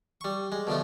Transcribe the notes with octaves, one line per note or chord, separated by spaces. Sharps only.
G3 C#6
G#3
B2 D3 F3 A3